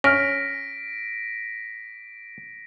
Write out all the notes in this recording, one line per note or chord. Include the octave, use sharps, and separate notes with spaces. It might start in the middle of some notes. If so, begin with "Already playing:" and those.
C#4 F6 A#6 B6 D7